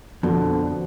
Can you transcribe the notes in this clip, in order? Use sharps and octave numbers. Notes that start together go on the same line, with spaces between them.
F2 B2 D3 F3